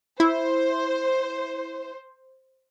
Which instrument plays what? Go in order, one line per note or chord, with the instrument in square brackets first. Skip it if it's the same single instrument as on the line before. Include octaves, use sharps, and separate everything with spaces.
[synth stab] E4 [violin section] C5